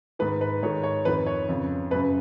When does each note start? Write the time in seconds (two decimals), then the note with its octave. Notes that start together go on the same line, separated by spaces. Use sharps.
0.19 G#2 D#3 B4
0.41 B4
0.62 G#2 D#3 C#5
0.83 C#5
1.05 F2 D#3 B4
1.26 C#5
1.49 F2 C#3
1.91 F#2 C#3 B4